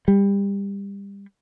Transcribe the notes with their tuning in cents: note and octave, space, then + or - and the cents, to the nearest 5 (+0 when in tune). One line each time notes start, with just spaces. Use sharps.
G3 +25